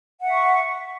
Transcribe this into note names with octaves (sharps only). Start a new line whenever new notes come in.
E5 F#5 C#6